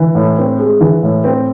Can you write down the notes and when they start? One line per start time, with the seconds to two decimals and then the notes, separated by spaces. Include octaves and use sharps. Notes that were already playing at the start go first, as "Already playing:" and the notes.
Already playing: E3
0.15 A2
0.38 C4
0.59 G#3
0.81 E3
1.03 A2
1.24 C4